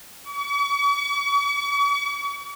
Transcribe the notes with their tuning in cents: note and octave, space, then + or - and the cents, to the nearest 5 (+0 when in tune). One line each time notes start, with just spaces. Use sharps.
C#6 +45